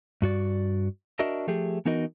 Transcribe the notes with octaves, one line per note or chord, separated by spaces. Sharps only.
G2 F#4 D5
D4 F#4 A#4 D#5 E5
F3 A3 G4 G#4
E3 B3 D#4 F#4 A#4 D#5